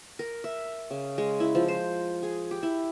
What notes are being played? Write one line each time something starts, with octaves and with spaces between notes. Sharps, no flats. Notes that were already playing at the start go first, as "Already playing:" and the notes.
A#4
E5
C#3
G#3
E4
F3
C5
G#4
G4
E4